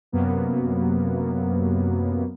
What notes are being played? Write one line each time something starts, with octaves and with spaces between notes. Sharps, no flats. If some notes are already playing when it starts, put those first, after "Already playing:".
F#2 C3 F#3 A#3 B3